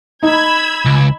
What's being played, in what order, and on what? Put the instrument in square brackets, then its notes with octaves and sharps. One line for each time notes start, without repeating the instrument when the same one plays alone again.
[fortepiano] D#4 [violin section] B5 E6 G#6
[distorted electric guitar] C#2